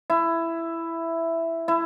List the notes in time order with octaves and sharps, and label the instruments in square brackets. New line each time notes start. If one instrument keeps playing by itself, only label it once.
[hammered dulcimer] E4
E4